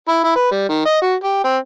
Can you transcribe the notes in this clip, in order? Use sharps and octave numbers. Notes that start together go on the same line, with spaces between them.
E4
E4
B4
G3
D#3
D#5
F#4
G4
C4